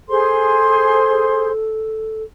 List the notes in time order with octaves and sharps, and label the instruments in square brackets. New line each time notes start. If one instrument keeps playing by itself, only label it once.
[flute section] G#4 C5 C6 [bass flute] A4